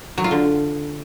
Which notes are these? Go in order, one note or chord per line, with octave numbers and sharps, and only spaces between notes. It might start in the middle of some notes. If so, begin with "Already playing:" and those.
F#3
F4
D3